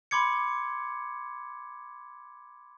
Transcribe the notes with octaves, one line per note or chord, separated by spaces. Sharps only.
B5 C6 D6 G#6 C#7